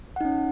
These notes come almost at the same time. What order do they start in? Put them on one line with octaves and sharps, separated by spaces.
F#5 D#4 C#4